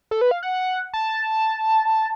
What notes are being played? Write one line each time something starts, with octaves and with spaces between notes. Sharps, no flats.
A4
B4
F5
F#5
A5